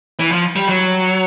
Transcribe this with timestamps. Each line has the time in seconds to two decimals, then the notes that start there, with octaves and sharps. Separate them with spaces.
0.20 E3
0.32 F3
0.56 G3
0.69 F#3